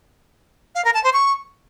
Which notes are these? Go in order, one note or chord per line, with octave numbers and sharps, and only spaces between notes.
F5
A#4
A5
C5
C#6